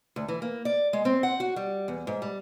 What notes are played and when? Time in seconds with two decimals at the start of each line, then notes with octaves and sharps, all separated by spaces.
0.16 D2
0.28 E3
0.42 A#3
0.65 D5
0.93 G#3
1.05 C4
1.23 F#5
1.40 F#4
1.56 G3
1.88 E2
2.07 G#2
2.22 G3